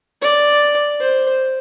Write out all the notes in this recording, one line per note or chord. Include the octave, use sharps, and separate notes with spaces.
D5
C5